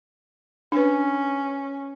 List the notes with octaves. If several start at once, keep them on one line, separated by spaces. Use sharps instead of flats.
C#4 D4 B4